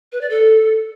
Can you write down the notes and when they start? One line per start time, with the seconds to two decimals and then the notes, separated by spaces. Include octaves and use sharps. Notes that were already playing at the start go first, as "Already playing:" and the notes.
0.12 B4
0.21 D5
0.30 A4